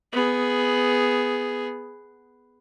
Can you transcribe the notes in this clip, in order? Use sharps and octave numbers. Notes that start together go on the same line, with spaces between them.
B3 G#4